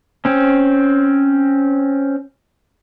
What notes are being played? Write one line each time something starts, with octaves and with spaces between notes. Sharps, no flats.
C4 C#4